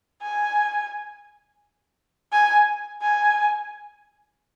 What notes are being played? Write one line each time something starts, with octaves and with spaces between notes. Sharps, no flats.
G#5
G#5
G#5